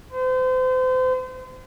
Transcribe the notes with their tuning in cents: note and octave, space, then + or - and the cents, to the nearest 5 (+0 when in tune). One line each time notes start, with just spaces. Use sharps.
C5 -35